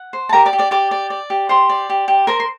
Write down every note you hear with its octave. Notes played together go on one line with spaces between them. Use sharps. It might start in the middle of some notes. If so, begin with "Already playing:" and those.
Already playing: F#5
C5
A5
G4 A#4 A#5
D5 D6
G4
D5 D6
G4 D5 D6
D5
D5
G4
G4 C5 C6
D5
G4
G4
A#4 C5 A#5
C6